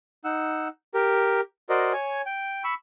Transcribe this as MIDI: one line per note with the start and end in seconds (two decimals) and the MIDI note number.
0.25 0.68 63
0.25 0.68 78
0.25 0.68 88
0.94 1.41 67
0.94 1.41 70
1.69 1.93 66
1.69 1.93 70
1.69 1.93 72
1.69 1.93 74
1.69 1.93 75
1.93 2.22 73
1.93 2.22 80
2.26 2.63 79
2.64 2.74 83
2.64 2.74 85
2.64 2.74 88